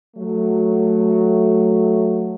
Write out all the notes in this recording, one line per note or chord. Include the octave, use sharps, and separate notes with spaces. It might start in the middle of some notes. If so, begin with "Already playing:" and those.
F#3 A3